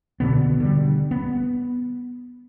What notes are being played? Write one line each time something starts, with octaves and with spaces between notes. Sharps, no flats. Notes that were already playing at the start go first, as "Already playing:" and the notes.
B2 D3 B3
D3 G3
B3